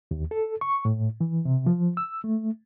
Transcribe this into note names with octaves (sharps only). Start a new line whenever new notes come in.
D#2
A4
C#6
A2
E3
C3
F3
E6
A3